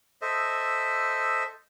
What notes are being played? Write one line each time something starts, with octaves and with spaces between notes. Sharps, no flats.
A4 C5 D#5 E5